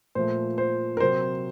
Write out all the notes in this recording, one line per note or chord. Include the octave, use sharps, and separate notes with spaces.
A#2 F3 A3 C5
C5
A#4
C3 F#3 C4 C5